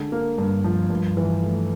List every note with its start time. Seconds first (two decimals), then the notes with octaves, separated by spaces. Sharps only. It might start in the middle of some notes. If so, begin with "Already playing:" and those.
Already playing: D3 G#3
0.12 A#3
0.38 G2
0.64 F3
0.90 G2
1.17 E3
1.42 A3